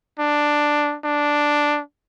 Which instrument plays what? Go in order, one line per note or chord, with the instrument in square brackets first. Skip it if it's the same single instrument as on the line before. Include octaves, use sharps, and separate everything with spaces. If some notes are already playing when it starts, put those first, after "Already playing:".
[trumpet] D4
D4